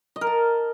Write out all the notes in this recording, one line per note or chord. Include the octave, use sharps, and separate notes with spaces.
D#5
A#4
A5